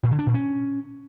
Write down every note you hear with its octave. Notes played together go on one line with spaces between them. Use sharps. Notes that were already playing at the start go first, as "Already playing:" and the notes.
A#2
D3
D4
A#2
C#4